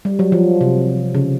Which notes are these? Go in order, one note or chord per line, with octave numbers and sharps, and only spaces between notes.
G3
F#3
F3
C3
C#3